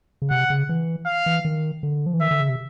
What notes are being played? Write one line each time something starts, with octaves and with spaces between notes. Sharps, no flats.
C#3
C3 F#5
C#3
E3
F5
E3
D#3
D3
F3
E3
D#3 E5
D3
C#3
C3